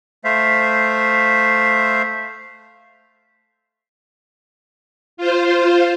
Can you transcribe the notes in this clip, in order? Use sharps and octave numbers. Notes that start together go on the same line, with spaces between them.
A3 C5 E5 F5
F4 C5